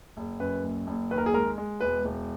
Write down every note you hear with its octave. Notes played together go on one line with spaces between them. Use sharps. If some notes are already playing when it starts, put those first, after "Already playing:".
F#1
F#2 B4
F#1
F#1
D#2 B4
A#4
G#4
G#3 A#4
G#3
E1 B4
E1